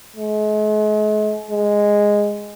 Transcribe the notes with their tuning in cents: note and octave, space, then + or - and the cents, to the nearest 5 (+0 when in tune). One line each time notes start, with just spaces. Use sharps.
G#3 +40
G#3 -5